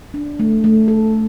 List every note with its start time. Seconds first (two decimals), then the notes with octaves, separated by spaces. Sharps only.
0.14 D4
0.40 A3
0.64 A3
0.88 A4